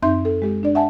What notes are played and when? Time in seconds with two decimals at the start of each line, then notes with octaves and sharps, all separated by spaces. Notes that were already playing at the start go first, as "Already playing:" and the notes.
0.03 F#2 C4 D#4 E5 C6 G6
0.25 A4
0.42 G#3 G4
0.63 D4 D5
0.75 E5 F#5 G#5 A5